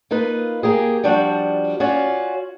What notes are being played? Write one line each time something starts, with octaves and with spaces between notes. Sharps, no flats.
A#3 D#4 F4 B4
A#3 G4 G#4
F3 G3 D4 F#4
C#4 F4 F#4 D5